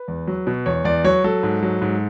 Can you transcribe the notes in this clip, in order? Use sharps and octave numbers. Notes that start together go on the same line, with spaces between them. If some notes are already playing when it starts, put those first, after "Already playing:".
Already playing: B4
E2
F#3
B2
E2 C#5
E2 D5
F#3 C#5
F#3 A4
G#2
F#3
G#2